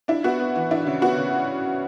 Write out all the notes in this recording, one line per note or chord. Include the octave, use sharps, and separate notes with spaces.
D4 E4
B3 F#4
B3
E3
D4 E4
C#3
B3 F#4
C#3